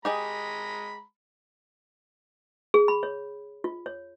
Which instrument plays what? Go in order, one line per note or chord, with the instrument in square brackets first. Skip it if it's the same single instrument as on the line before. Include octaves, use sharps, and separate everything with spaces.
[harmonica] G#3 A#5 B5 [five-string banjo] G4 G#4 D#5
[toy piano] G#4
B5
C#5
F4
C#5